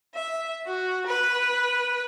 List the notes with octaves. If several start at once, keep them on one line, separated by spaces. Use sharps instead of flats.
E5
F#4
B4